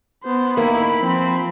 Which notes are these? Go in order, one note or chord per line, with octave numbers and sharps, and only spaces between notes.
B3 C5
A1 D#3 A#3 E4 B5
F3 C4